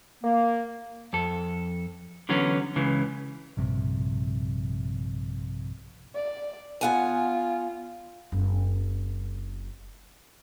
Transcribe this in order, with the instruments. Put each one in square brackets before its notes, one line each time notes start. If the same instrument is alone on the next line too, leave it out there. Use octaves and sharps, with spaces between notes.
[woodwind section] A#3
[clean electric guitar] F2 A4
D3 E3 F#3 B3 C#4
C#2 C#3 E3
[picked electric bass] A#1 G2 C3
[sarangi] D5
[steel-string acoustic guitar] B3 F#5 G#5 [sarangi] F4
[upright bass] F#1 C4